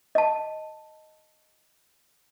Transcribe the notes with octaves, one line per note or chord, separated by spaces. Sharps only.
D#5 A5